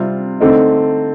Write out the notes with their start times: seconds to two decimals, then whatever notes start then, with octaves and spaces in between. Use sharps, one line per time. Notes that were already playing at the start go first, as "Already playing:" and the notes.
Already playing: C3 G3 C4 F4
0.40 D3 A3 C4 D#4